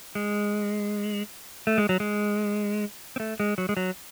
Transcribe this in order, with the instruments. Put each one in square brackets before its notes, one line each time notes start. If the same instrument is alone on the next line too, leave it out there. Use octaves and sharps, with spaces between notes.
[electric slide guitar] G#3
A3
G#3
F#3
G#3
C4
A3
G#3
F#3
G#3
F#3